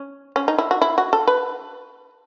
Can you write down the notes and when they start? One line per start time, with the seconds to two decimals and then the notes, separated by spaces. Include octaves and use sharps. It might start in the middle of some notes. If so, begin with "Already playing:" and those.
Already playing: C#4
0.36 C#4
0.48 D#4
0.58 E4
0.71 F#4
0.82 E4
0.98 F#4
1.13 A4
1.27 B4